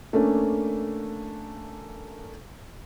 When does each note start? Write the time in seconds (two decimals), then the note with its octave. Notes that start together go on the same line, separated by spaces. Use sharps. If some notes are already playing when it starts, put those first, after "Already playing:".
0.13 A3 A#3 C#4 D4 A4